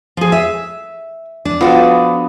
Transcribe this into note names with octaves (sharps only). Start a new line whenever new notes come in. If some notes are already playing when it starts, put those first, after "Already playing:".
F3 G#4
E5
D4
F3 B3 F#4 A4